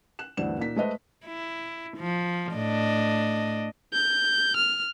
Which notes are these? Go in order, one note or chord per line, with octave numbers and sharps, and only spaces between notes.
F#6 E7
D2 G2 E3 C4 D5 E7
A#2 A#3 D#4 B6
G#3 A3 B4 C5 D#5 E5
E4
F3
A2 D4 D#5
G6
F6